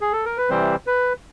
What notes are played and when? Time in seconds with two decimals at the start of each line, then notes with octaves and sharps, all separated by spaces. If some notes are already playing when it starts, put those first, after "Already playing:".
0.00 G#4
0.13 A4
0.25 A#4
0.37 B4
0.50 C3 E3 G3 C4 C5
0.87 B4